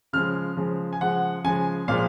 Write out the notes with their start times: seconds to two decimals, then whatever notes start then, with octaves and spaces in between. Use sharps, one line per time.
0.13 C#3 F3 G#3 F6
0.57 C#3 F3 G#3
0.93 G#5
1.01 C#3 F3 G#3 F#5
1.44 C#3 F3 G#3 G#5
1.88 A#2 F3 G#3 F5